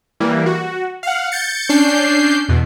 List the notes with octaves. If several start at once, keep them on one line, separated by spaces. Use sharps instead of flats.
E3 G3 A#3
F#4
F5 F#5
G6 A6 C#7
C#4 D4 G6 C7
E2 B2